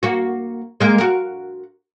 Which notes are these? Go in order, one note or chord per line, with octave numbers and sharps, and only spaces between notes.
A#3 F#4
G#3 A#3 A#4
F#4 A#4